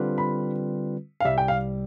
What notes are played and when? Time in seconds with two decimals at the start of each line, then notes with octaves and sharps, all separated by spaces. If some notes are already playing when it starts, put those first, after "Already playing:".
Already playing: D3 G3 C4 F4 B4
0.18 B5
1.20 F5
1.25 C2 C3 G3 E5
1.38 G5
1.48 F5